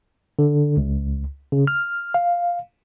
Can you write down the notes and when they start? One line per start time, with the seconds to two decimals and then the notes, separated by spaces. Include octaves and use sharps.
0.39 D3
0.77 C#2
1.52 C#3
1.67 F6
2.14 F5